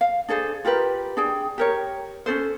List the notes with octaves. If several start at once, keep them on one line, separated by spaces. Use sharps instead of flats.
F5
D4 G#4 A4 C5
F4 G4 A#4 B4
D4 G#4 G5
G4 A#4 C#5
C#4 D4 A4 C5